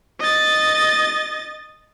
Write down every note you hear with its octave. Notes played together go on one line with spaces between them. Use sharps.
D#5 A6